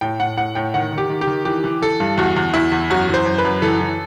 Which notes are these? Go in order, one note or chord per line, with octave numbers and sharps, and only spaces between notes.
A2 G5
A2 F#5
A2 F#5
A2 G5
D#3 F#5
D#3
G4
D#3
G4
D#3
E3 G4
E3
E3 A4
G2
E2 F#4
E2
E2 E4
E2
F#2 F#4
E3 C5
F#2
B4
F#2
E3 A4
E3